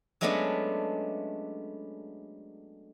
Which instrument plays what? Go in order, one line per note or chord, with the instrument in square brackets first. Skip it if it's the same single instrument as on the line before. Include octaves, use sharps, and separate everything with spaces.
[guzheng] F#3 G#3 A3 B3 C#4 D4